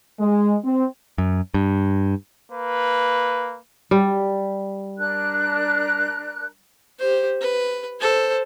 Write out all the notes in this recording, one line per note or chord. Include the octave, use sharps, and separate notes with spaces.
G#3
C4
F#2
G2
A#3 B4
G3
D4 A#4 F#6
G4 C5
B4
A4 C5